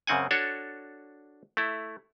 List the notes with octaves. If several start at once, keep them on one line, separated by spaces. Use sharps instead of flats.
F#2 C#3 C4 F#5 G#5
D4 F#4 A4 C#5
A3 E4